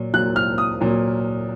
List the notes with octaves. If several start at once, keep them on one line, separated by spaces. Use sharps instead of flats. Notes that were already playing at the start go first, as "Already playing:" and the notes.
Already playing: A#2 F#3
A#2 F#3 F#6
F6
D#6
A#2 F#3